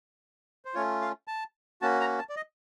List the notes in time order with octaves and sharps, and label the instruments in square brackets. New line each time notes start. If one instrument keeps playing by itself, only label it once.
[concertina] C5
A3 C#4 F4 C#5
F5
A5
A#3 C#4 F#4 A5
A#5
A5
D5
D#5